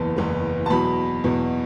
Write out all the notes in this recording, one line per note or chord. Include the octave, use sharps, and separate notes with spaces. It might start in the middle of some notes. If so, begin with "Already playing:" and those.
Already playing: F#1 E2 E3 B3 A5
F#1 E2 E3 B3
A5
E2 B2 F#3 B5
E2 B2 F#3